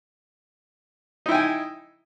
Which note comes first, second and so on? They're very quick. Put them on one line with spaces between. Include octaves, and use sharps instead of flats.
D#4 E4 G5 G#5